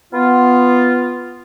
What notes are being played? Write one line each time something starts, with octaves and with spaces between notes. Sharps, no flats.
B3 F4